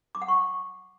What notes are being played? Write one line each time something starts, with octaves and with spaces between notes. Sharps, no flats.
D6
F#5
C#6